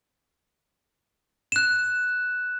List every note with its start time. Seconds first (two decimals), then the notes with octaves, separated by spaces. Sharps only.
1.52 F#6 E7